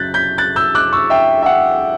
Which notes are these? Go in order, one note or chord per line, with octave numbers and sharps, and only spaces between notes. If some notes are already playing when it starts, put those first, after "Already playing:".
Already playing: C#3 F#3 F#6 G6 A6 B6
G6 B6
F#6 A6
E6 G6
D6 F#6
C#6 E6
E5 G5
E5
F#5